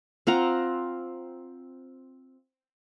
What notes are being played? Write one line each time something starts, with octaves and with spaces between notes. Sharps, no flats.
C4 F4 F#5 A#5